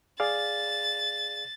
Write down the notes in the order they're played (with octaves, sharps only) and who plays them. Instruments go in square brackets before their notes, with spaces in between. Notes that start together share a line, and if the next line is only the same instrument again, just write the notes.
[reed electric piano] G#4 D5 F5 [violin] A6